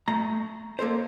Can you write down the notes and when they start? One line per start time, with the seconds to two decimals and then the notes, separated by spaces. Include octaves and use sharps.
0.08 A3 A#5
0.79 A#3 A4 A#4 C5